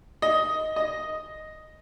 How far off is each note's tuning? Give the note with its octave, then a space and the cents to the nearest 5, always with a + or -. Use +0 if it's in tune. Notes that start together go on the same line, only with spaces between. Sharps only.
D#5 +10
D#5 +0